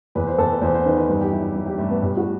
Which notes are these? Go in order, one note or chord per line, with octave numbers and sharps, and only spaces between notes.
E2 B4
C5
E2 A4
B4
E2 C5
C5
D#3 B4
B4
G2 B4
G4
F#3 E4
E4
F#3 E4
G4
G2 A3
B3
A2 G4
F#4